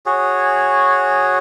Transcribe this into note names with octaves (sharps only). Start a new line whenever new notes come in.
F#4 G#4 C#5